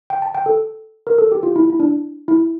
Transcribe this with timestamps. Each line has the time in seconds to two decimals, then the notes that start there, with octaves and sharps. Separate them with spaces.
0.10 G5
0.22 A5
0.35 G5
0.46 A4
1.07 A#4
1.18 A4
1.32 G4
1.43 F4
1.56 E4
1.70 E4
1.80 D4
2.28 E4